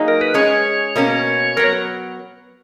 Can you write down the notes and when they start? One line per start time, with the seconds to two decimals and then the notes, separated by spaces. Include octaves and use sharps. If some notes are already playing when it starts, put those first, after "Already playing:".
Already playing: F#3 A#3 D#4 G#4
0.08 A#4
0.21 B4
0.34 G#3 C#4 G#4 C#5
0.96 B2 A#3 C#4
1.57 F#3 B3 A#4